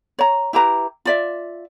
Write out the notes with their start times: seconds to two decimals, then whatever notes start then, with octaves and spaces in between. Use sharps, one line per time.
0.19 C#5 A#5
0.53 E4 G4 B4 A#5
1.05 F4 D5 E5